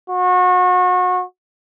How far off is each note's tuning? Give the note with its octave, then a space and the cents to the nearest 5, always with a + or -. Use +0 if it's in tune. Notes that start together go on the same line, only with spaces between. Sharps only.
F#4 -30